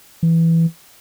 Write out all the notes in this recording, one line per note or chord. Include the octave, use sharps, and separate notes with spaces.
E3